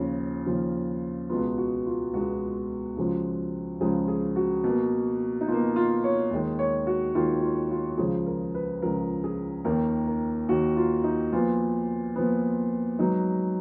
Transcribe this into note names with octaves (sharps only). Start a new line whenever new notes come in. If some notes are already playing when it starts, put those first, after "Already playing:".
Already playing: D#2 C#3 F3 F4
D#2 C#3 F3
C#2 B2 G#3 B3 F4
F#4
F4
C#2 B2 G#3 B3 F#4
C#2 C#3 F3 G#3
C#2 C#3 F3 G#3 G#4
G#4
F#4
B2 A#3
D#4
B2 A#3 F4
F4
C#5
D#2 D#3 G#3
C#5
F#4
D#2 D#3 G#3 F4
F4
F4
C#2 C#3 F3 G#4
A#4
B4
C#2 C#3 F3 A#4
G#4
D#2 D#3 A#3 A#4
A#4
D#2 D#3 A#3 F#4
F4
D#4
A#2 F3 B3 F4
A#2 F3 B3
G#2 F#3 B3 D#4